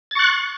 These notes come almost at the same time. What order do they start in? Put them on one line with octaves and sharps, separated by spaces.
A6 C#6 F#6